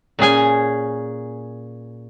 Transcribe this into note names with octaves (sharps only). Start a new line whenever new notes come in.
A#2 C#4 G#4 G#5